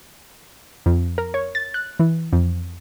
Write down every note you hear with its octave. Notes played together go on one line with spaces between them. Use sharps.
F2
A#4
C#5
A6
F#6
E3
F2